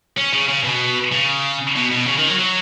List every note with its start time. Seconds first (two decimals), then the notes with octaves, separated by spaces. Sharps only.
0.17 C#4
0.33 C#3
0.48 C#3
0.64 B2
1.12 C#3
1.76 B2
1.91 B2
2.06 C#3
2.18 D#3
2.28 F#3
2.39 F#3